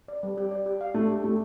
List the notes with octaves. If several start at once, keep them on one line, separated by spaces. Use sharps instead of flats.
D5
G3
G4
D5
G4
F5
A3 D4
G4
A3 G4